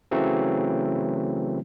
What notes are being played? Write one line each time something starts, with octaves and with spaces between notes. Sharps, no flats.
C#3 E3 F#3 A3 C4